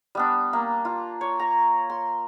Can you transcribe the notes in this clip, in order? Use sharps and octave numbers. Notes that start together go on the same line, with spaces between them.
G3 B3 D4
A#3
F4
C#5
A#5
C6